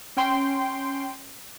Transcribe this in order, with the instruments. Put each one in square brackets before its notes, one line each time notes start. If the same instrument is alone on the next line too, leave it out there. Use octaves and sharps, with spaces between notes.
[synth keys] C#4 G5 C6